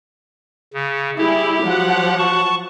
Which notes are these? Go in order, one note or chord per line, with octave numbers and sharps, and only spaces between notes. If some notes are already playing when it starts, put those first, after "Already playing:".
C#3
G3 E4 G4 G#4
F3 F#3 F#5
A5 C#6